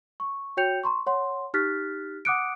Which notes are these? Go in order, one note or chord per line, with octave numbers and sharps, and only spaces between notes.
C#6
F#4 C#5 G5 G6 C#7 F7
A#5 C6 C#6
C#5 F#5 C6
D#4 G4 F6 F#6 A6 B6
F#5 D6 D#6 F#6 C#7 D7